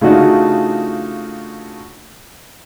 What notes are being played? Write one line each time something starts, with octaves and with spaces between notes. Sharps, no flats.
C#3 A3 D4 D#4 F4 F#4